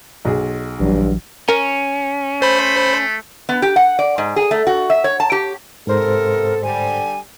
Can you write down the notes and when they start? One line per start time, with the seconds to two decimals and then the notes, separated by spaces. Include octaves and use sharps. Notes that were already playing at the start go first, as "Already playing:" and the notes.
0.25 B1 G#4
0.80 A#1 G2 E3 F#3
1.49 C#4 A#4
2.42 A3 C5 B5
3.49 B3
3.62 G4
3.76 F#5
3.99 D5
4.18 G#2
4.36 G#4
4.51 A3
4.67 F#4
4.90 E5
5.04 C#5
5.20 A5
5.32 G4
5.87 G#2 C3 B3 A4 A#4 C5
6.62 D3 G3 G#5